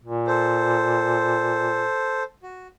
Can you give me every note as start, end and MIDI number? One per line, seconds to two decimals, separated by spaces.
0.04 1.87 46
0.27 2.23 69
0.27 2.23 72
2.43 2.67 66